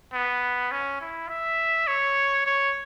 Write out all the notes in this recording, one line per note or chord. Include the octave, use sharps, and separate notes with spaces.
B3
C#4
E4
E5
C#5
C#5